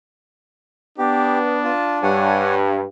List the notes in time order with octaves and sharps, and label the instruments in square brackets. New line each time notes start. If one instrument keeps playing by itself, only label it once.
[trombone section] B3 [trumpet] D4 [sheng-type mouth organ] G4
[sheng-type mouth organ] F4 A5
[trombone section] G2 [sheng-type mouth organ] C#5 F#5 G#5